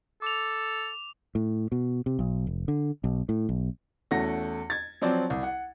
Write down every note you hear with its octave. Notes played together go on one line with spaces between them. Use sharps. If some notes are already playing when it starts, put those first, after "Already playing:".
A4 D6 F7
A2
B2
C3
B1
F1
D3
B1
A2
B1
E2 A3 C#4 F#4 A#6
G#6 A6
F3 F#3 C4 C5 D5
C2
F#5